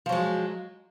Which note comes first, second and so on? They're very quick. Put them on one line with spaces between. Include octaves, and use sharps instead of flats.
F3 F#3 G#3